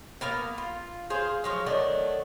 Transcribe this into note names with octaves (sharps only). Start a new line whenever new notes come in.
A#3 B3 F5 A#5
F4
G#4 C5 F5
F3 F#3 F5
D#3 F#3 A3 D4